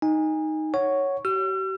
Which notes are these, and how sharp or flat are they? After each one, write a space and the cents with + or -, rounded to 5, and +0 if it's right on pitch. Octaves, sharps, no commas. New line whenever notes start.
D#4 +0 G#5 -25
C#5 +0 F#5 +0 C#6 +0
G4 -45 E6 +45